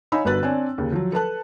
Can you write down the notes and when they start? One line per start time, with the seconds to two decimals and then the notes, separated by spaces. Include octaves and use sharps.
0.12 D#4 C#5 F5 G#5 B5 E6
0.25 G1 D3 F#4 B4 F#6 A6
0.43 C4 D4 C#5 D5 G#5
0.78 D#2 C#3
0.92 F3 F#3
1.12 A4 B4 A5 F#6